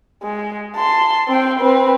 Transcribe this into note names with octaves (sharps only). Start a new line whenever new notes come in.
G#3
A5 C6
C4 G5
C4 B4